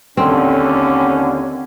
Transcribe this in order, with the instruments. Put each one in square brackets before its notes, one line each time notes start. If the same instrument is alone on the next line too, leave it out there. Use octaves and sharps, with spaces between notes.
[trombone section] D#2 D3 [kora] C4 [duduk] C#4